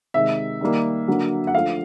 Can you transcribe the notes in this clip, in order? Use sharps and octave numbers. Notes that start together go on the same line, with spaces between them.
C3 D#3 G#3 E5
D#3 G3 A#3
D3 F#3 A#3
F#5
D3 F3 A3 F5